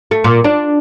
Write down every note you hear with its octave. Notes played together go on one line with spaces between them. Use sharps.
A3
A#2
D4